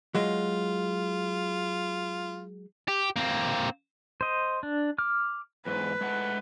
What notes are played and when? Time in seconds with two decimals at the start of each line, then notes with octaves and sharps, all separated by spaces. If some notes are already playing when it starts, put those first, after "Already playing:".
0.15 F#3 G#3 F4
2.88 G4
3.16 A#3 C4
4.21 C5 D#5
4.63 D4
4.98 D6 F6
5.66 E2 G#2 B4
6.01 G#3 A3 F#5